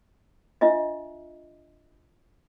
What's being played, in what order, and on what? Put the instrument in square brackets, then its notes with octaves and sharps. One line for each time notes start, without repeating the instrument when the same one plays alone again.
[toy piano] D4 F4 D#5 E5